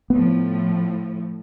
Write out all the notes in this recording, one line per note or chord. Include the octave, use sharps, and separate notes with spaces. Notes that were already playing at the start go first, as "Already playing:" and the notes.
A2 F3 B3